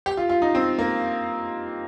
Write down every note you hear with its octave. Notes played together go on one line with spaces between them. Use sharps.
G4
F4
F4
D#4
C4
A#3